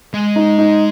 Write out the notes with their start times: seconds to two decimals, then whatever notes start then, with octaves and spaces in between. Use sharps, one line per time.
0.14 G#3
0.36 D#4
0.58 D#4